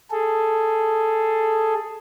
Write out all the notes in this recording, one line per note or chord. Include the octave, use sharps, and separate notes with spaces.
G#4 A4